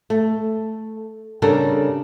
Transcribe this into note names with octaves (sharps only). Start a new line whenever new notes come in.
A3
C#3 G3 D4 A4 A#4